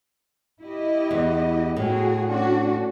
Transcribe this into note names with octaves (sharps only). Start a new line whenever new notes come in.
E4 G4 D#5
E2
A2 A3 F#4 G#4
C#4 D4 F#4